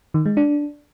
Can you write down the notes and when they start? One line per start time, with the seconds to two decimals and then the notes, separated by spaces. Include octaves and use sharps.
0.14 D#3
0.26 G#3
0.37 D4